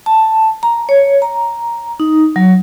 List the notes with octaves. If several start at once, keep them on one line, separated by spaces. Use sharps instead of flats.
A5
A#5
C#5
A#5
D#4
F#3